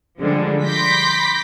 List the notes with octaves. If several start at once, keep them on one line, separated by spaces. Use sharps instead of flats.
D3 F3 G3 G#3
B5 C6 D6 G6 A#6 B6